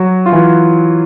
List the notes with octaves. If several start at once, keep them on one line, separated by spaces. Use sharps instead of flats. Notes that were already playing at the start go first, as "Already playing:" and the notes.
Already playing: F#3 F#4
F4
E3 E4